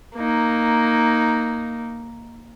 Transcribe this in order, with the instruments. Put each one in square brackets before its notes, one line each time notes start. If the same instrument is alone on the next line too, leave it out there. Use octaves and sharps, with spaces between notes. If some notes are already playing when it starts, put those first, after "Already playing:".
[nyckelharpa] A#3 D#4